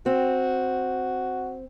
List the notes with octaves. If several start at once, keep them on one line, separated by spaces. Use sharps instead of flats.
C4 F#4